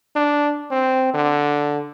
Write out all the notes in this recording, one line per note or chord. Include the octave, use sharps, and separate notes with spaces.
D4
C4
D3